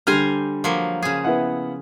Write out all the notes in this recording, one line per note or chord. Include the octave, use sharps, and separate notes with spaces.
D3 G3 C5 G#5 A#5 F6
F3 F#3 A#3
C#3 G#4
B3 E4 F#5